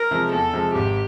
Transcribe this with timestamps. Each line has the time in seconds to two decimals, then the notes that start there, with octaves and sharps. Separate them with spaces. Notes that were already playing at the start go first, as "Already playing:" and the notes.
Already playing: A#4
0.11 C3 F3 G#3
0.32 E2 A4
0.53 C3 F3 G#3
0.74 G#1 G4